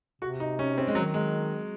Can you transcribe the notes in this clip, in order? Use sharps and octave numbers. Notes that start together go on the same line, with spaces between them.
C3 F#4
D#4
C#4
C4
G#3
D#3 F#3
G#3